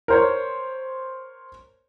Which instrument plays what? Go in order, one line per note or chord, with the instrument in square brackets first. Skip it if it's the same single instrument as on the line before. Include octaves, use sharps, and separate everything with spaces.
[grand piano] A#4 C5 C#5